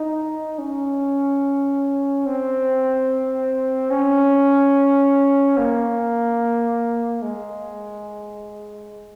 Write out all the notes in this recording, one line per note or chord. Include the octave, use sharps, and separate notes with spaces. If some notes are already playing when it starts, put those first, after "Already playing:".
Already playing: D#4
C#4
C4
C#4
A#3
G#3